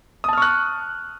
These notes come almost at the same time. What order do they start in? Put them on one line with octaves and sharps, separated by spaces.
D#6 A5 F6 C#6 F#6